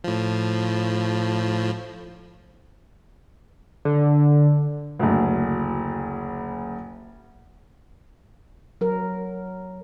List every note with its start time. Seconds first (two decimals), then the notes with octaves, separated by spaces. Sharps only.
0.04 A2 F3
3.85 D3
4.99 F#1 D2
8.81 F#3 A#4